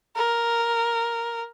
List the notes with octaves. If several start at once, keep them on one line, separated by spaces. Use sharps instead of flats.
A#4